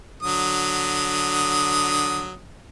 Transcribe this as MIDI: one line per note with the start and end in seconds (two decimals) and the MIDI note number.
0.23 2.35 50
0.23 2.35 54
0.23 2.35 87